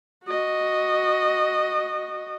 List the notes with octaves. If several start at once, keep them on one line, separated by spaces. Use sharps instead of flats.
F#4 D#5